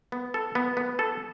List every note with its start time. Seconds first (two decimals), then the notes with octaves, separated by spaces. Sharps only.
0.12 B3
0.34 A4
0.55 B3
0.77 B3
0.99 A4